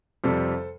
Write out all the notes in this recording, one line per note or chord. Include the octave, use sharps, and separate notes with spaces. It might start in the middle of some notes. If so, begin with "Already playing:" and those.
F2 C3 G3 A4 C5